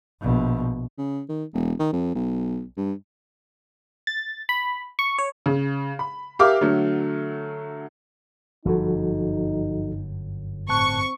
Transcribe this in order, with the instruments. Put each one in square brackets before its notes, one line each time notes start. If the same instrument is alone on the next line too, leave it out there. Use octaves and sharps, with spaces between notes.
[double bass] A#1 B2
[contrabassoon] C#3
D#3
E1
D#3
F2
B1
G2
[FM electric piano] A6
B5
C#6
C#5
[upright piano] C#3
B5
G4 A#4 E5 F5 D6 F6
D3 F#3 A3
[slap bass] G1 F#2 [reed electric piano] F3 F#4 A4 [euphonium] D#4
[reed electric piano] A2 A5 F#6 [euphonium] C4 [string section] C#6